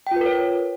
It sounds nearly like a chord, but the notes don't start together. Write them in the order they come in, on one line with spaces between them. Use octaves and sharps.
G5 F4 B4 A#4 C#5